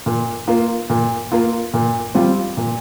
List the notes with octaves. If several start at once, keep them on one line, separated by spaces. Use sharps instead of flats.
A#2
A#3 F4
A#2
A#3 F4
A#2
G3 C4 F4
A#2